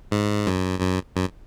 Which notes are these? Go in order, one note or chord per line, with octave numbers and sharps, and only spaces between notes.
G#2
F#2
F#2
F#2